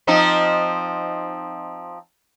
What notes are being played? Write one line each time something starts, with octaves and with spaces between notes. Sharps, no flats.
F3 C4 D#4